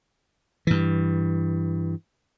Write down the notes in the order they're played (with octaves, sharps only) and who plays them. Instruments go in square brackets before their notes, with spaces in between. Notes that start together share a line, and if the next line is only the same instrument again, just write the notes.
[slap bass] G2 E3